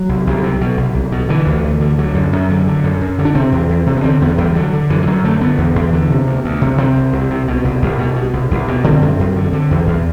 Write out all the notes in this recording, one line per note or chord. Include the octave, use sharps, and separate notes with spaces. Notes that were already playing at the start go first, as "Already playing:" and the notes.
Already playing: F#3
C2
C2
C3
B2
C2
C2
B2
D3 E3
D2
D2
D3
D3 F#3
F#2
F#2
D3
D3
F#2
F#2
D3
D4
C3 C4
E2
E2
C3
B3
D3 C4
E2 B3
E2 G3
D3 F#3
D3
F#2 E3
E3
F#2 F#3
D3 A3
D3 B3
E2
E2
D3
C3
D2
D2
C3
C3 C4
C2
C2
C3
B2
C2
C2
B2
B2
C2
C2
B2
D3 C4
F#2
F#2
D3
D3
E2
E2